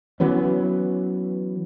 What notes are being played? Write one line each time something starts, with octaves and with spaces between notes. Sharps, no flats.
E3 F#3 B3 C#4